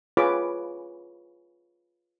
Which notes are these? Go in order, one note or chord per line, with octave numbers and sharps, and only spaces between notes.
F4 G#4 B4 C#5 B5 D6